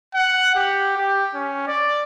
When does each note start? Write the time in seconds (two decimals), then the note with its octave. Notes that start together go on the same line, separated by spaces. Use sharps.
0.15 F#5
0.55 G4
0.98 G4
1.34 C#4
1.67 D5